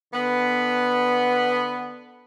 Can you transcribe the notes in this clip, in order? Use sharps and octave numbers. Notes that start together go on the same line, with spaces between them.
D3 B3